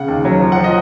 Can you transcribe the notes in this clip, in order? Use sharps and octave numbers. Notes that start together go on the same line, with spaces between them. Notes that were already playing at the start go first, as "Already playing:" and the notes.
Already playing: C#3 F#5
D#2
F#3
F3
F#5
F3
D#5